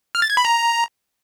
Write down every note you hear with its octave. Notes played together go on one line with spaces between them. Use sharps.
F6
A6
G#6
B5
A#5